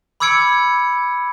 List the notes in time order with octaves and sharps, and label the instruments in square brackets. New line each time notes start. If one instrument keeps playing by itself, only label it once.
[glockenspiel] B5 D6 E6 G#6 C#7 D7